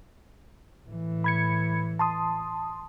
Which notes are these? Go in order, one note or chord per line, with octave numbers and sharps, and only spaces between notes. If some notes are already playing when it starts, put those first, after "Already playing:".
A2 E3
B5 G#6 C#7
A5 C6 D#6